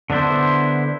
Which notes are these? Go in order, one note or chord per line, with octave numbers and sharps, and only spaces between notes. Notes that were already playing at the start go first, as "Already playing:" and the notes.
D3 B3 D4 E4 C5